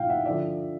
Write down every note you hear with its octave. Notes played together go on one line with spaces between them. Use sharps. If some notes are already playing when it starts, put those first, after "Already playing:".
Already playing: A#2 F3 F5 G5
E5 F#5
D3 F3 D5 E5